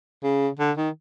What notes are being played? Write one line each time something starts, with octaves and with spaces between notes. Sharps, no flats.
C#3
D3
D#3